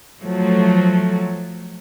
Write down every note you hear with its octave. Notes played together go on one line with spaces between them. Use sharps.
F3 F#3 A3